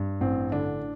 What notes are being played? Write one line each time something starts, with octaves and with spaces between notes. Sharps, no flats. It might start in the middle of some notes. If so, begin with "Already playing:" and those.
Already playing: G2
A1 C4
D3 D4